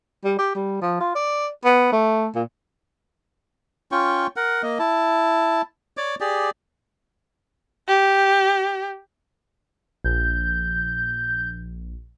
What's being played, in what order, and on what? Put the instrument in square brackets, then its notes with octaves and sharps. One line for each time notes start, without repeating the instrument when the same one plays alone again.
[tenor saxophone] G3
G4
G3
F3
F4
D5
B3
A3
A#2
[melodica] C#4 F4 G5 C#6
A#4 F#5
A#3 D#5
E4 A5
C#5 D5 D6
G4 G#4 D5
[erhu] G4
[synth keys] A#1 [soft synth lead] G6